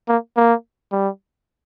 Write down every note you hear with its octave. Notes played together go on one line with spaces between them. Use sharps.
A#3
A#3
G3